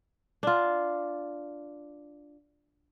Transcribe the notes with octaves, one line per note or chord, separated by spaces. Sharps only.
D4 F4